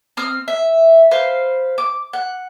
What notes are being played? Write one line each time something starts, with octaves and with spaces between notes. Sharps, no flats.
C4 D#6 F6
E5
B4 C5 F5
D6
F#5